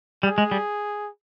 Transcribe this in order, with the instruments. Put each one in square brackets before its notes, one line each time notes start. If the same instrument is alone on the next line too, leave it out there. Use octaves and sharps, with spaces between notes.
[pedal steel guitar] G3 [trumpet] G#4
[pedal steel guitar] G#3
G3